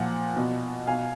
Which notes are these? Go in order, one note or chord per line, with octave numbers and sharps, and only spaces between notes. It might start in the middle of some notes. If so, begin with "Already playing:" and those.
Already playing: A#2 F3 F#5
B2
B2 F5 G#5